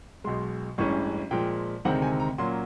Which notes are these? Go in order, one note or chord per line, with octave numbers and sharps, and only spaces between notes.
B1 B2 G#3 C6
A1 G2 E3 G#3 C#4 C#6
A#2 F3 G#3 G5
D2 C3 D#3 G#3 C4 F#5
G#5
A#5
A#2 F#3 A#3 C#4 C6